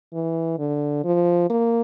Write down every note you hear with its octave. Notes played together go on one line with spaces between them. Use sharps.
E3
D3
F3
A#3